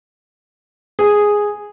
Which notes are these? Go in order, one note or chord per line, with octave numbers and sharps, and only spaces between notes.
G#4